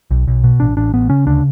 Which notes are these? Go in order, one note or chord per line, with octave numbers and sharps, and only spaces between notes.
B1
B1
B2
A1 D4
A1 D4
A1 B3
C#3 C#4
D2 D4